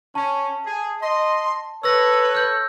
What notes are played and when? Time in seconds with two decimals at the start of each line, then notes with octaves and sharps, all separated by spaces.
0.15 C#4 A5
0.65 G#4
1.02 D#5 C6
1.83 A4 B4 C#5 E6 A#6
2.35 F6 G6